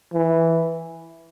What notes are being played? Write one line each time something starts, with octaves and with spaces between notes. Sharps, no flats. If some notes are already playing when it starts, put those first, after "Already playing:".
E3